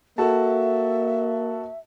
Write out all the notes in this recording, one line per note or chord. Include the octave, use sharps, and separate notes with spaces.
A#3 F#4 A4 E5 A5